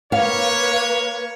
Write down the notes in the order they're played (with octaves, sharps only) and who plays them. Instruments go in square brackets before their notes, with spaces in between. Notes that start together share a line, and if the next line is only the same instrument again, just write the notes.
[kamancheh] A#3 B4 [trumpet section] C#5 [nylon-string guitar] F5